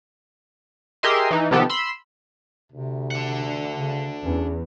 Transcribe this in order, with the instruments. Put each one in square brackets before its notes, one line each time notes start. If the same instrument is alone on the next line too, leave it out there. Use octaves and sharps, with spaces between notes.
[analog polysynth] G4 G#4 A#4 D#5 E5 C6
E3 D#4
C3 D#3 F3 B3 G4 A4
B5 C6 E6
[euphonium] D2 [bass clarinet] C3
[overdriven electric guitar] D4 F#5
[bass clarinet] C#3
[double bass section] E2 [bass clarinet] C#4